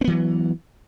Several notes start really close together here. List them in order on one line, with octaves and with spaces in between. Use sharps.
C4 B3 E3 F#3